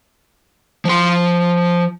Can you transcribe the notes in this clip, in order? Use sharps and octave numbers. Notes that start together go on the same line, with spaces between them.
F3 C6